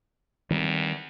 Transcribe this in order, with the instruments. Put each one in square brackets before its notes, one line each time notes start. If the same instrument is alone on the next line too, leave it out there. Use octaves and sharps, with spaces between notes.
[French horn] E2 [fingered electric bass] D#3 G3 C4